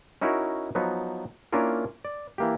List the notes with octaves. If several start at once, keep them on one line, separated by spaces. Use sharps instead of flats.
C#4 D#4 E4 F#4 A#4
F3 F#3 B3 D#4
A#3 C#4 D4 E4 F4 A#4
D5
E3 A#3 G4